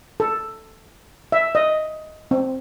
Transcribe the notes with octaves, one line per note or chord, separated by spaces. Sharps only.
A4
E5
D#5
C4